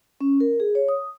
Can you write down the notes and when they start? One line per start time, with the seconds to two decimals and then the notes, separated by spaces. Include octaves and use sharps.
0.21 C#4
0.40 A#4
0.60 G#4
0.75 C#5
0.89 D#6